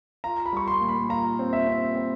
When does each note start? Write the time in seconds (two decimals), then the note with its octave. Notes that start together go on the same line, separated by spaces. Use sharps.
0.24 F4 A#5
0.46 B5
0.53 G3 C#6
0.67 C6
0.81 A#2
0.88 B5
1.10 F4 A#5
1.39 C4
1.53 E5
1.67 C4
1.95 C4